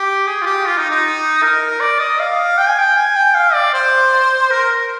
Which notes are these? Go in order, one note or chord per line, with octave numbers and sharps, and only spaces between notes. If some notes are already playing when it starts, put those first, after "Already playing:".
Already playing: G4
G#4
F4
G4
F4
D#4
D#4
A#4
D5
D#5
F5
G5
G#5
G5
G#5
G5
F5
D5
C5
A#4